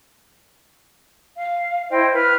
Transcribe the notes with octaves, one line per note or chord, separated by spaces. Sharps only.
F5
E4 C5 D#5 G5
B4 B5 F6